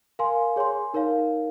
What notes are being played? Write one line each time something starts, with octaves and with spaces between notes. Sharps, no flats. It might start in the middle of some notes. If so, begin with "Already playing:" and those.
A#4 F5 G#5 C6
G#4 C#5 G#5 C6
D#4 A#4 C#5 F5